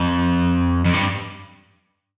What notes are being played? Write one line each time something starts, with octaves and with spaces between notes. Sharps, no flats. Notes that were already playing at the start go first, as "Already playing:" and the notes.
Already playing: F2
F2
G2